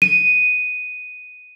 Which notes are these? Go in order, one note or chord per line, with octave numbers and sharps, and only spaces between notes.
D#7